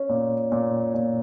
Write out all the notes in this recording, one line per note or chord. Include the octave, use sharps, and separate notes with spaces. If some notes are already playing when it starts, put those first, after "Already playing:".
Already playing: C#4
A#2
A#2
A#2